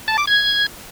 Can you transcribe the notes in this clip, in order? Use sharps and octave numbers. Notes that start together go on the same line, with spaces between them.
A5
D6
G#6